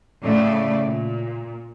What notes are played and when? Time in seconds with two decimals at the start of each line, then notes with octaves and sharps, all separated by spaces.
0.23 A2 C#3 A3 D5
0.88 A#2